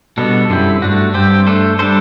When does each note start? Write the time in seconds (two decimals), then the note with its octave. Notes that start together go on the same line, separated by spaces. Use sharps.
0.17 B2 G3 B3 D4 A4
0.49 F#2 D3 G3 C4 E4 G4
0.82 G2 A3 D4 F#4
1.14 G2 C4 G4 C5
1.47 A3 D4 A4 C5
1.79 G3 D4 A4 C5